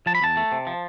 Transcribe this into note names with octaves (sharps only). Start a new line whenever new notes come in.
F3 A5
B5
E2 A5
A3
C3
F3